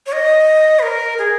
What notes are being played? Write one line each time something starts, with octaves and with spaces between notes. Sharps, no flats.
C#5
D#5
B4
A#4
G#4